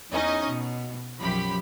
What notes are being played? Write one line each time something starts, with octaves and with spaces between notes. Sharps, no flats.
E2 C#4 D#4 D#5 G#5
B2
B1 F#2 F3 G4 B5